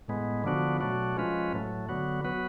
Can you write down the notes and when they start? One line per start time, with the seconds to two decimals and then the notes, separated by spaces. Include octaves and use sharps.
0.08 A2 G#3 B3
0.44 D3 F3 B3 D4 F#4
0.81 B2 F#3 A3 D4 F#4
1.16 F3 G#3 C#4 F4 B4
1.53 A2 F#3 A3
1.89 D3 F#3 B3 F#4
2.24 F#3 B3 F#4 B4